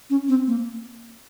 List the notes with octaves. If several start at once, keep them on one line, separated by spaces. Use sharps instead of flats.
C#4
C4
A#3